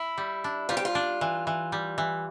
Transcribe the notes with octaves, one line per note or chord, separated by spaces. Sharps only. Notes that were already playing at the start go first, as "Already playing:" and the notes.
Already playing: E4
G3
D4
G3 F4
G4
F4
D4
E3
E3
G3
E3